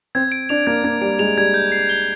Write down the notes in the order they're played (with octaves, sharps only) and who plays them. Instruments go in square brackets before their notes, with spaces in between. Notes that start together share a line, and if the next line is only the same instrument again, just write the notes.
[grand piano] C4 [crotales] G#6
[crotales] D7
[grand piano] D4 [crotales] F7
[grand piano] A#3 [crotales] G#6
[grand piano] A#3 [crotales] G#6
[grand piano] G3 [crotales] D7
[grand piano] G#3 [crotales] F7
[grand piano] G3 [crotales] G#6
[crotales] G6
C7
G7